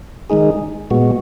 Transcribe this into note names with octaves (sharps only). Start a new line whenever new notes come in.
D#3 G#3 D#4 G#4
A#2 G#3 B3 F#4